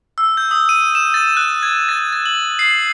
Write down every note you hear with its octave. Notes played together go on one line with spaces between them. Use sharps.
E6
G6
D#6
D#7
E7
A6
F#6
G#6
A6
A6
F#7
C7